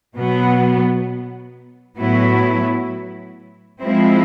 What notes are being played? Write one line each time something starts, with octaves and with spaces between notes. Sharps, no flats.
B2 F#3 B3
A2 F#3 B3 E4
F3 G#3 C4 E4